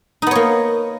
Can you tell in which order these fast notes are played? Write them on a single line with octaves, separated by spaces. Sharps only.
D#4 B3 C#5 A#3